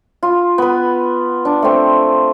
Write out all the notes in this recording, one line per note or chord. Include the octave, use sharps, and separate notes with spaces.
F4
B3 B4
D4
A3 C4